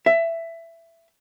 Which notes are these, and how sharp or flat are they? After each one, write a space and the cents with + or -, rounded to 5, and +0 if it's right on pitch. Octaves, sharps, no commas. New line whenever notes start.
E5 +15